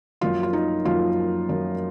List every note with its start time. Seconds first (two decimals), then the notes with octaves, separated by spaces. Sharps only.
0.21 F#2 F3 A#3 F4
0.43 F4
0.53 D#4
0.85 F#2 F3 A#3 F4
1.49 F#2 F3 A#3